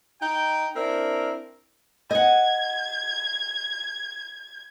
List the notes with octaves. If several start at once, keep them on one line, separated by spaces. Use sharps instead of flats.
D#4 G5
C4 D4 E4 A#4
D#5 F#5 G#6